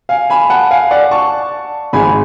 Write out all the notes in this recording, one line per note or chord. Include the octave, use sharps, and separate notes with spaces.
F5 G#5
G#5 B5
B5
F#5 A5
F5 G#5
D5 F#5
A5 C#6
G#1 G#2 G#3 G#5 B5